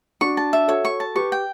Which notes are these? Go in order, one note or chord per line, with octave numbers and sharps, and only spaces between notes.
D4 F#4 C#6
A5
E5
F#4 A4 C#5
C#6
A5
G4 B4 C#6
G5